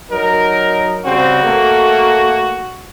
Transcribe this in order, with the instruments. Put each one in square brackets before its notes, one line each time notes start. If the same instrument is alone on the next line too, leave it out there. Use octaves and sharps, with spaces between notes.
[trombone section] F#3 D#4 A#4
[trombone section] C#3 G3 C4 [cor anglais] F#4
[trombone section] A3 A#3